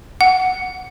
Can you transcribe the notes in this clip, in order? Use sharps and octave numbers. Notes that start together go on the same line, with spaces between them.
F#5